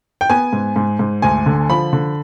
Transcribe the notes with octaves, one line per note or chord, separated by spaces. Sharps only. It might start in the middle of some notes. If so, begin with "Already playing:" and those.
G5
B3 G#5
G#2
G#2
G#2
D2 G#5
D3
F3 B5
D3